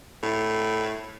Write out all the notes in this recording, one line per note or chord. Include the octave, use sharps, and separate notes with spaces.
A2